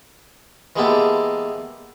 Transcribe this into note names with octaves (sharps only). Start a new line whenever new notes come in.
E3 G#3 A#3 B3 G4 A4